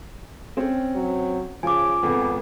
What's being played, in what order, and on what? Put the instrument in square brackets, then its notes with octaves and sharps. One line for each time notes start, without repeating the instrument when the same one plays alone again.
[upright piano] C4 C#4
[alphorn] F#3
[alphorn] C#3 [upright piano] F3 [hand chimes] G#5 D6
[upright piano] G#1 F2 [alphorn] B3